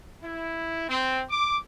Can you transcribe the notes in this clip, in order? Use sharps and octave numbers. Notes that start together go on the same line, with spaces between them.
E4
C4
D6